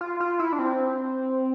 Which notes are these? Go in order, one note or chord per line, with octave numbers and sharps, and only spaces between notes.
F4
F4
E4
D4
C4